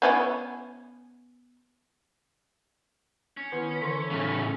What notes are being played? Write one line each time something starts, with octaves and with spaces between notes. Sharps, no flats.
B3 C#4 E4
C#4
D#3 B3 E4 F4
D3 E3 A3 C6
A2 C#3